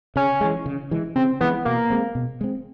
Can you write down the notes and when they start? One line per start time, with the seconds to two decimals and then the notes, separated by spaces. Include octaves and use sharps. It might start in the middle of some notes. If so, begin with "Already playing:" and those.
0.16 C#3 C#4
0.41 E3 G#3
0.66 C#3
0.91 E3 G#3
1.16 C#3 C4
1.40 E3 G#3 B3
1.65 B2 A#3
1.90 G#3 C4
2.15 B2
2.41 G#3 C4